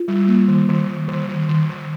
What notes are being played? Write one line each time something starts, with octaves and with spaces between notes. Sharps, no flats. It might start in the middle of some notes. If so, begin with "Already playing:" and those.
Already playing: F4
G3
A#3
D#3
D#3
G3
D#3
D#3
D#3
D#3